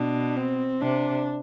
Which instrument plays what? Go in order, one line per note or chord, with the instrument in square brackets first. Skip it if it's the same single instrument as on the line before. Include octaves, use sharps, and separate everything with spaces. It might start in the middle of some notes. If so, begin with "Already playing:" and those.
Already playing: [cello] B2 [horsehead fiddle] D4
[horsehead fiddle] C4
[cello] C3 [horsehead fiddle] D4